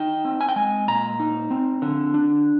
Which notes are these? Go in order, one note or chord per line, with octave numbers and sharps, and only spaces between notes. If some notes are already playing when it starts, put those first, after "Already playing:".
Already playing: D#4 G5
C4
G#5
G5
G#3 G#5
A#2 A#5
D#4
C4
D3
D4